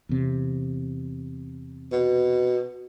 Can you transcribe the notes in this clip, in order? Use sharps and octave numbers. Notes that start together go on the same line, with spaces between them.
E2 C3
B2